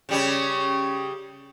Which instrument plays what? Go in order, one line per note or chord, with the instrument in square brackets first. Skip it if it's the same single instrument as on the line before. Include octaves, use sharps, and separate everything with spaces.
[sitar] C#3 G3 C#4